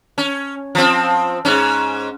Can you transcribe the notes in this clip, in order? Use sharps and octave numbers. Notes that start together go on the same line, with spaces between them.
C#4
F3 C4
G#2 C#4